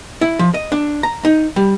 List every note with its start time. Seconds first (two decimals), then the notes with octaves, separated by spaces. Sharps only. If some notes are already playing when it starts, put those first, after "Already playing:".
0.21 E4
0.39 F3
0.54 D#5
0.72 D4
1.03 A#5
1.25 D#4
1.56 G3